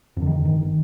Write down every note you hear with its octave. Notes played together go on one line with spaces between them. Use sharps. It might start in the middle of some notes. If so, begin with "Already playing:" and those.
F2 D3
D#3
G1 D#3